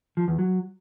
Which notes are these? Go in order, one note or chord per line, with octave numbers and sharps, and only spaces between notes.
F3
E2
F#3